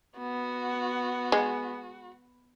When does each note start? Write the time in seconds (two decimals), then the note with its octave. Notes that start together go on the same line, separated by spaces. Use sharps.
0.19 B3 F#4
1.32 G#3